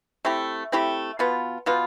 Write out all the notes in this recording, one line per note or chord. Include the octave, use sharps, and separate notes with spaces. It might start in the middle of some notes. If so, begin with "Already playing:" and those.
A3 C4 E4 G4
A3 C4 E4 G4
B2 B3 F4
B2 B3 F4